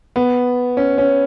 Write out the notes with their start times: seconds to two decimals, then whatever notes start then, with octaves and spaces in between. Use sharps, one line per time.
0.16 B3
0.77 C#4
0.98 C#4